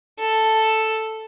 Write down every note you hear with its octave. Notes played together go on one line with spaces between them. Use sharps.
A4